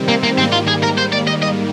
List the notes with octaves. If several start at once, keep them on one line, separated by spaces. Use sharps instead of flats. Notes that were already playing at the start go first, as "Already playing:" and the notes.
Already playing: C3 D#3 G3 C4
A#3
A#3
G#2 D#3 G3 A#3 C4
F4
G#4
A#4
C5
D5
D#5
D#5